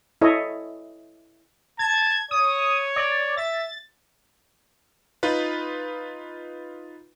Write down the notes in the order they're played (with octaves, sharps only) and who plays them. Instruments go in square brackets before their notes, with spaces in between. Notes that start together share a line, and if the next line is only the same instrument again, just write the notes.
[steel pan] E4 A4 C#5 D#5
[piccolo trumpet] A5 [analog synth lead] G#6
[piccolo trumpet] C#5 [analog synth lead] D#6
[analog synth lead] D5
[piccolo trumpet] E5 [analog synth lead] A6
[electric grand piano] D#4 F4 B4